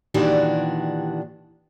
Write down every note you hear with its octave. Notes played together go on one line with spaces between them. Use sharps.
A#2 D#3 E3 D4 F#4 G4